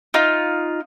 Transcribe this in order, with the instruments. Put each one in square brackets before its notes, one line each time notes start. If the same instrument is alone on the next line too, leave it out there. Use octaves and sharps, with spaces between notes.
[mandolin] D#4 F4